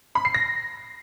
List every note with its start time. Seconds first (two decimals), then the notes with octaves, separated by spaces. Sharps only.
0.15 B5
0.25 C7
0.34 A#6